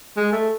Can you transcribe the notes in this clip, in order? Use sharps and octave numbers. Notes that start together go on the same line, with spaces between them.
G#3
A3